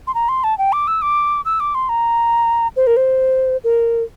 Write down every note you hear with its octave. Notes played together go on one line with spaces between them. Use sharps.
C6
A#5
C6
A5
G5
D6
E6
D6
E6
D6
C6
A#5
C5
A#4
C5
A#4